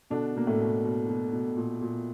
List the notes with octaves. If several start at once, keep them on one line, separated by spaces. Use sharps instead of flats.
B2 D3 D4
B2 A#3
A2 A3
B2
B2
B2
B2
A#2
A#2